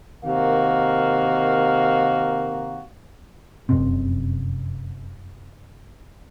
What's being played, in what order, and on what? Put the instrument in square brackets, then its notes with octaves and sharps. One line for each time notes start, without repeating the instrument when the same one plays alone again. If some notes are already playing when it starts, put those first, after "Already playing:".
[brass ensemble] C3 D#3 A#3 F#4 A#4 F5
[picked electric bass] F1 F#2 C3 C4